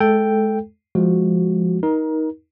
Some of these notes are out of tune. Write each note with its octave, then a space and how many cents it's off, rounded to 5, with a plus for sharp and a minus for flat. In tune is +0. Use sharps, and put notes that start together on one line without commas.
G#3 +30 A4 +0 G5 +0
F3 +0 G#3 +0 F#4 +0
D#4 +15 A#4 +25